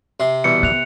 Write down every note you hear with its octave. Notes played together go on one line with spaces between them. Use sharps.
C3 C6
B2 E3 G3 C#7
B3 F#6 F7